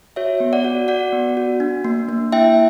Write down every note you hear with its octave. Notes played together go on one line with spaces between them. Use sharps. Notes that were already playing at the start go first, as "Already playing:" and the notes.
F#4 C#5 E5
B3
D5 F#5
F#4
F#4 D5 F#5
B3
F#4
D4
A#3
A#3
E4 E5 G5